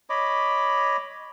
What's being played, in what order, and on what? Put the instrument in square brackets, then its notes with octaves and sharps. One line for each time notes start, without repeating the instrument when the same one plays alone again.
[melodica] C#5 D#5 B5 D6